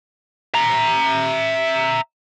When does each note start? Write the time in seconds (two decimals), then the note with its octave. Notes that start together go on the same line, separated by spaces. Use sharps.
0.54 E5 A#5